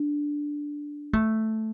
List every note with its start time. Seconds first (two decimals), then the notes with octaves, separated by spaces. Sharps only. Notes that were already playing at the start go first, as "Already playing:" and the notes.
Already playing: D4
1.13 A3